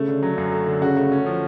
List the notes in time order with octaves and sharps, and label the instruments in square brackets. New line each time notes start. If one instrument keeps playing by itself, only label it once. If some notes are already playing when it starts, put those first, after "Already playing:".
Already playing: [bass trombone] C#3 [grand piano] A3
[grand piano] D3
F#3
F#2
A3
D3
[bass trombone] C#3 [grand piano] F#4
[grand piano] A3
C#4
F3